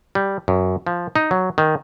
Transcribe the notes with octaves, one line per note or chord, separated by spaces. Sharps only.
G3
F#2
F3
D#4
F#3
D#3